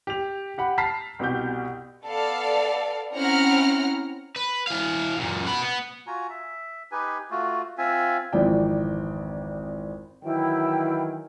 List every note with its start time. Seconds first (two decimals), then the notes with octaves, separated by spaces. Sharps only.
0.07 G4 F7
0.58 G4 F#5 B5
0.78 A5 A#5 F6 B6 C7
1.19 C2 B2 G4 G6
2.05 B3 A4 D5 F5
3.14 C4 C#4 E4 F#5 A#5 F6
4.36 B4
4.67 E3 F5
5.18 F#2 A#2
5.47 F#4 B5
5.63 B3
6.07 F4 F#4 G#5 A#5
6.30 E5
6.92 D#4 G4 B4 G#5
7.31 A3 F4 F#4
7.78 C4 F4 E5 G#5
8.33 G#1 F2 E3 D5 G5
10.23 D#3 E3 F#3 E4 G5